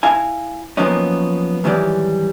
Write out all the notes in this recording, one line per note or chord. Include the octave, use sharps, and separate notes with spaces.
E4 F5 G#5
F3 F#3 A#3 B3 C#4 D#4
G#2 D#3 E3 F#3 G3